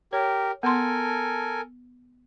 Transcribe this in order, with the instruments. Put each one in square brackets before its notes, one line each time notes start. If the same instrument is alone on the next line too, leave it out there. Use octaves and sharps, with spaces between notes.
[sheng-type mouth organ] G4 A#4 [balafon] C#5
[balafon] B3 C6 [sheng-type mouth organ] A4 A#4 G#5